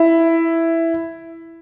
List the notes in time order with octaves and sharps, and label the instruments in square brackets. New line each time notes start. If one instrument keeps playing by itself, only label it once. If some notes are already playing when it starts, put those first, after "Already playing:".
Already playing: [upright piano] E4